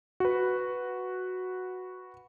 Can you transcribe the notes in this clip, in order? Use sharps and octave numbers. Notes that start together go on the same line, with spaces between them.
F#4 B4